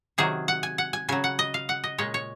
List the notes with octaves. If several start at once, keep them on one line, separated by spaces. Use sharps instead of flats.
C3 D#3 F#3 G#4
F#5
G#5
F#5
G#5
C#3 F#3 G#5
F#5
D#5
F5
F#5
D#5
A#2 G#3 C#5
C#5